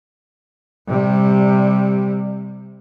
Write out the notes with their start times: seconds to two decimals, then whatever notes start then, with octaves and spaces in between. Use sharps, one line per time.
0.87 C3 G3